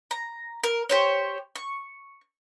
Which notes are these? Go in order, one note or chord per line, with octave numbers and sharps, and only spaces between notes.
A#5
A#4
G4 C5 C#5
C#6